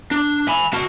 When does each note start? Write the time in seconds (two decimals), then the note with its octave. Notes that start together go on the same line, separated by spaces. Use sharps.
0.11 D4
0.48 G#5 B5
0.73 F#4 A5